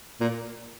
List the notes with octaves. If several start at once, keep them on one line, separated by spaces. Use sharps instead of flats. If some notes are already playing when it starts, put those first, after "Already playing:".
A#2